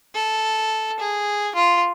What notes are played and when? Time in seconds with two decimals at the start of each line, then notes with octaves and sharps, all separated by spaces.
0.15 A4
0.99 G#4
1.55 F4